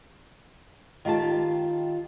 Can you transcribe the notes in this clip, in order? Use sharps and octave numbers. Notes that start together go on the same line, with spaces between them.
D#3 F4 G4 G#5 A5